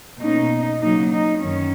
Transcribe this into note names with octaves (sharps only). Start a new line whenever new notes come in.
B2 A#3 C#4 D#4
C#3 F#3 A#3 D#4
D#4
F#2 D#3 C#4